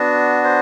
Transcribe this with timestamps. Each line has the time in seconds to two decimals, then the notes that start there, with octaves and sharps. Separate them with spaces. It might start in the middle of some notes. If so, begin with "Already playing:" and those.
Already playing: B3 D4 F#4
0.44 C5